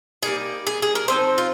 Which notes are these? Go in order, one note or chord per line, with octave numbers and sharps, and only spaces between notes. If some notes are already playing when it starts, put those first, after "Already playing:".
G3 A#3 D#4 G#4
G#4
G#4
A#4
F3 C4 D#4 C5
F4